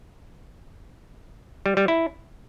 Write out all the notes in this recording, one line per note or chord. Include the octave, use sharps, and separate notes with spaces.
G3
G3
E4